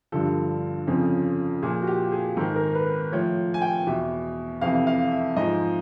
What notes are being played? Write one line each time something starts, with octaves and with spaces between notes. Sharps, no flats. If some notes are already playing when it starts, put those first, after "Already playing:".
G2 D3 F3 A4
F2 C#3 F3
A#2 F3 G#4
F#4
G4
G#4
G#2 D#3 A4
A#4
B4
A2 F3 C#5
G#5
G5
E2 B2 E5
F2 C3 E3 F5
F5
E5
G#2 F3 D#5